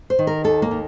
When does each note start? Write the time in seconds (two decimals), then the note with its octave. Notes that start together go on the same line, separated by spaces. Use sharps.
0.10 C5
0.19 D#3
0.27 A#4
0.44 D#2 A4
0.62 A#3
0.71 D#3